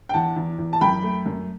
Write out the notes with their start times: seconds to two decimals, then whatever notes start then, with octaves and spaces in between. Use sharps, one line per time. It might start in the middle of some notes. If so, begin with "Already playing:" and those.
0.09 G5
0.13 E2 F#5 A5
0.36 E2
0.58 E2
0.73 A5
0.81 F#2 G5 B5
1.03 A3
1.26 F#2